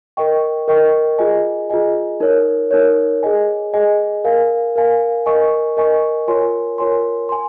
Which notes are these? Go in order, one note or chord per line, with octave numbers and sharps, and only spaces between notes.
A#4 D#5 G5 C#6
A#4 D#5 G5 C#6
F4 G#4 D#5 G#5
F4 G#4 D#5 G#5
D#4 A#4 C#5
D#4 A#4 C#5
G#4 D#5 G#5
G#4 D#5 G#5
A#4 F5 G#5
A#4 F5 G#5
A#4 D#5 G#5 C#6
A#4 D#5 G#5 C#6
F4 A#4 C#5 G#5 C6
F4 A#4 C#5 G#5 C6
G#5 C6